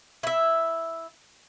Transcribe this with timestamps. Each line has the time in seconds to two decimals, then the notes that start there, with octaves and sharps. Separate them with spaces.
0.23 E4 E5